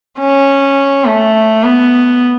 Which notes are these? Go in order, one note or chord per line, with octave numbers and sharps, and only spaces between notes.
C#4
A3
B3